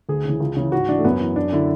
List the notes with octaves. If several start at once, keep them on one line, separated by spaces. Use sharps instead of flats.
D2 G#4
C#3 E3
C#2
C#3 E3
G#2 F#4
E3 D4
A3
F#2 B3
E3
F#2 D4
D3 E4